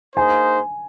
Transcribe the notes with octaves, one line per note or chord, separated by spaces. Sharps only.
A#3 D#4 G#4 C5 G#5